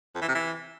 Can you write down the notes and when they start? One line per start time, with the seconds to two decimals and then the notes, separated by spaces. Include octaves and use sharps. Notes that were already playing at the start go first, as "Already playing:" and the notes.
0.15 F2
0.22 E3
0.28 C3
0.35 E3